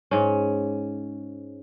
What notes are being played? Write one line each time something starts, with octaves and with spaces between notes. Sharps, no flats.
G#2 C#4